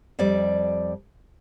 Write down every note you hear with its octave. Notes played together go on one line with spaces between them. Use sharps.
F2 G3 D5